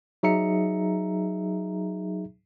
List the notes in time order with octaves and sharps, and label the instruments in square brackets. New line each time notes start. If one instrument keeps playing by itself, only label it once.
[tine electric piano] F#3 D#4 G#4 E5 A#5 C#7